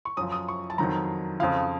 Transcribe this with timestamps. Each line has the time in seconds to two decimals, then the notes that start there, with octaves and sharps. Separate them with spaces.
0.05 C#6
0.17 F#2 F3 D#6
0.32 D#6
0.48 C#6
0.70 A5
0.78 F2 D#3 F#3 A#5
1.40 F2 C#3 F3 F5